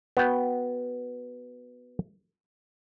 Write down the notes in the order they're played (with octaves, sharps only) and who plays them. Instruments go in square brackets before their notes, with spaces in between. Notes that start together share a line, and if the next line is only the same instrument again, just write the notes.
[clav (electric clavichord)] B3 F#4 G5